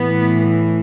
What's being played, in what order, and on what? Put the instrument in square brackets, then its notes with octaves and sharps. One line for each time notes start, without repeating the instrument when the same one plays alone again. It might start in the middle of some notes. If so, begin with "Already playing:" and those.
Already playing: [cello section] A2 E3 B3